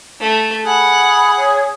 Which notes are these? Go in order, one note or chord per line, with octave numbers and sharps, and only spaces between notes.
A3
G#4 F#5 B5
C#5